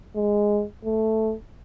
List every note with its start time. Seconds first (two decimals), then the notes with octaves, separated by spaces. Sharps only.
0.16 G#3
0.85 A3